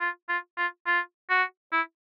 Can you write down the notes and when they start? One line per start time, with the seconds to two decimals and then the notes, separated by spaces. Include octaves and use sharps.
0.01 F4
0.29 F4
0.57 F4
0.86 F4
1.30 F#4
1.72 E4